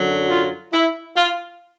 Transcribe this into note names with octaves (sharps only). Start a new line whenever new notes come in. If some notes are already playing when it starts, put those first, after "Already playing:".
Already playing: F#2 D3 F#3
F4
E4
F4